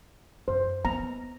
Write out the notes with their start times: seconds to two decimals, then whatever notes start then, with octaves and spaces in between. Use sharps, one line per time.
0.48 F#2 C5
0.85 B3 A#5